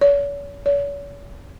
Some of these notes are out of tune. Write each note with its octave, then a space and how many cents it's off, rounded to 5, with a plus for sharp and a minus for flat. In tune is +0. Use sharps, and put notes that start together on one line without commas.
C#5 +40
C#5 +40